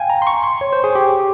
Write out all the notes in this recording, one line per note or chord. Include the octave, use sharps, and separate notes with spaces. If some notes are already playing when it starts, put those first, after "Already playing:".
Already playing: F5 G5 G#5
A#5
C6
C#6
C6
C#5
C5
G#4
G4